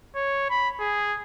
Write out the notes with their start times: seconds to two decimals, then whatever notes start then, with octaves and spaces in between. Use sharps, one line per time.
0.15 C#5
0.50 B5
0.80 G#4